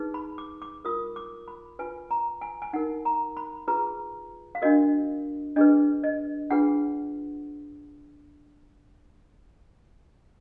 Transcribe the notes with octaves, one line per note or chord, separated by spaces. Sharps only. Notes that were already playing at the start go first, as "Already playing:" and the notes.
Already playing: D#4 G#4 B4
B5
D6
D6
F4 A#4 D#6
D6
B5
F4 B4 G#5
A#5
G#5
G#5
D#4 A#4 F#5
A#5
B5
F4 G#4 B4 A#5
F5
D4 F#4 A#4 D#5
D4 G#4 B4 D#5
D#5
D4 F4 G#4 B4 F#5